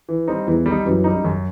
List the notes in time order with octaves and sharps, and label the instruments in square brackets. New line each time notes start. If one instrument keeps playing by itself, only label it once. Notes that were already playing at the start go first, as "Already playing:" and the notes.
[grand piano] E3
G3 C4 D#4
[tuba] E2 [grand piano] E3
[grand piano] G3 D#4
[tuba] F#2 [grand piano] E3
[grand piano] G3 D#4
F#2